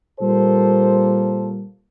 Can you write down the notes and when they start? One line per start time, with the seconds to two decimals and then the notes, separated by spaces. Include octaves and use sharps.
0.19 A#2 G3 A#3 A4 C5